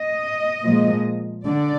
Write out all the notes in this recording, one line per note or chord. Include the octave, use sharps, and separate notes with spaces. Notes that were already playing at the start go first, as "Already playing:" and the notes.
Already playing: D#5
A#2 F3 G#3
D3 D5